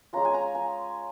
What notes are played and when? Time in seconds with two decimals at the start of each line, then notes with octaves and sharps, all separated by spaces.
0.13 G#3 C#4 F4 A#5
0.25 G#5
0.34 A#5
0.55 G#5